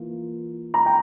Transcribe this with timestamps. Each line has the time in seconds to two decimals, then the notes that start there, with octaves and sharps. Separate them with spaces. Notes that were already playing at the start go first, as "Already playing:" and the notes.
Already playing: E3 A#3 F4
0.74 A#5
0.86 G5